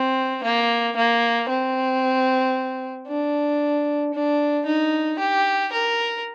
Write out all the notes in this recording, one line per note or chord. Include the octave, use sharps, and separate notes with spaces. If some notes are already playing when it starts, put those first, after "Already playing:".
Already playing: C4
A#3
A#3
C4
D4
D4
D#4
G4
A#4